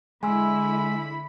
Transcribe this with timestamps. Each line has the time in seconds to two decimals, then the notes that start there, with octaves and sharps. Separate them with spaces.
0.23 D3 G#3 E4 G#5 B5 C6 E6